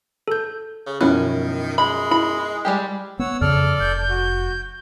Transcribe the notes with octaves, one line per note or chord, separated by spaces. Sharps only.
A4 G6
C#3
F#2 B2 D#3 F3 B3 C#4 E4 F#6
G#3 B5
E4 B5
G3 G#3 G4
B3 C#5 F#5 E6
F2 C#3 A4 D5 F6
F1 G6
F#4